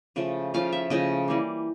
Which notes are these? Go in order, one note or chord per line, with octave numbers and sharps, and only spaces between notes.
C#3 F3 A3
C#3 F3 A3 F5
E5
C#3 F3 A3 D#5
E3 G3 A#3